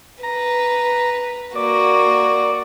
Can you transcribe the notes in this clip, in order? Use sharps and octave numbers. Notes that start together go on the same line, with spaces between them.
B4 A#5
A#3 F#4 D5